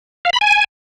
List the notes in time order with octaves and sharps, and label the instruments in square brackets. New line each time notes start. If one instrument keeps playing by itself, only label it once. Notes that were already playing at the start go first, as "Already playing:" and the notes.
[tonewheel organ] F5
B5
G#5